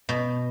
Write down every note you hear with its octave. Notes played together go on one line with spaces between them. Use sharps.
B2